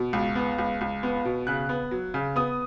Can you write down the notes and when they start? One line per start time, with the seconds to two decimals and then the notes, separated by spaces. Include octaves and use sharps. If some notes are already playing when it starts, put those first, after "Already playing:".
Already playing: B2
0.13 C#2
0.35 B3
0.59 C#2
0.81 C#2
1.03 B3
1.25 B2
1.47 C#3 F#6
1.69 B3
1.91 F#3
2.14 C#3
2.36 B3 D#6